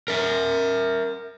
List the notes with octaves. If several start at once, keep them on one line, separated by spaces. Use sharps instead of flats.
A#4 E5